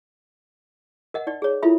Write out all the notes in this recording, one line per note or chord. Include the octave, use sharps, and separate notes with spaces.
A#4 D#5 F#5
D#4 D5
G#4 C#5
E4 F4 A4 E5 B5